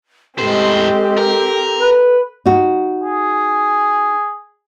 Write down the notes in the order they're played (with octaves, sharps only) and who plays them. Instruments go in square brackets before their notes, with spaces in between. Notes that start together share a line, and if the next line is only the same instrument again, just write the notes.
[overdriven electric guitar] A2 C5 [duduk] G#3 [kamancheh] C4 G4 [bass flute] A4
[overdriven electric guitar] A#4
[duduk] B4
[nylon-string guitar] D#4 F#4
[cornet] G#4